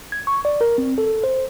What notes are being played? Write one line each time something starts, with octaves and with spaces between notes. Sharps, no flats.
G#6
C#6
D5
A#4
C4
A4
C5